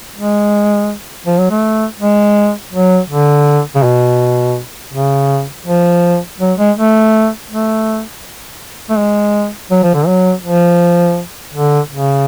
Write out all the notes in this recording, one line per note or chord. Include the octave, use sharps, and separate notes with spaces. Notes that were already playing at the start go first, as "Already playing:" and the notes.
G#3
F3
F#3
A3
G#3
F#3
D3
C#3
B2
C#3
F3
F#3
G#3
A3
A3
A3
G#3
F#3
F3
D3
F#3
F3
D3
C#3